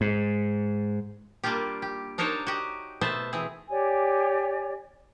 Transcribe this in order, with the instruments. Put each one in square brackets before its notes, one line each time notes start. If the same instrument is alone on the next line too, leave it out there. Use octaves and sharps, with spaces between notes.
[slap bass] G#2
[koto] G3 A#3 D4 F4 G4
G4
D4 D#4 A#4 C5 C#5 A5
F#4 G4 D#5
B2 A3 B3 C5 E5 A5
E3 C4 G#4
[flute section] G4 C#5 D5 G#5